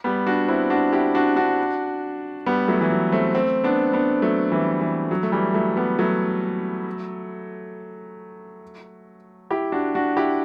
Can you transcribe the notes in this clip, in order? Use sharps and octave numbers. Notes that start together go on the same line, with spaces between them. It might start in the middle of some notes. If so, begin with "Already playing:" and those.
G3 B3
D4 F#4
C4 E4
D4 F#4
E4 G4
D4 F#4
D4 F#4
G3 B3
F#3 A3
E3
F#3
A3 C4
A3 C4
B3 D4
B3 D4
F#3 A3
E3 G3
E3
F#3
A3
E3 G3
F#3 A3
G3 B3
F#3 A3
E4 G4
D4 F#4
D4 F#4
E4 G4